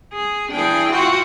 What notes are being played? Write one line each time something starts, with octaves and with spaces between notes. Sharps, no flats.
G#4
E3 D4 G#4 G5
F4 F#4